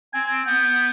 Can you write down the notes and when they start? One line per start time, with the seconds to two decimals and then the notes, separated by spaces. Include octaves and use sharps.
0.13 C4 G#5
0.46 B3 G5